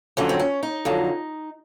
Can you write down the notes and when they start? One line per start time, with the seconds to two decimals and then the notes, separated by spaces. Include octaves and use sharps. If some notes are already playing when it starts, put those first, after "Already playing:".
0.17 F2 D3 F#3 C#4
0.29 C4
0.39 C#4
0.63 D#4
0.85 F2 D3 F#3